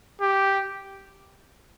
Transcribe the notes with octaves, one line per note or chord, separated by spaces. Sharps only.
G4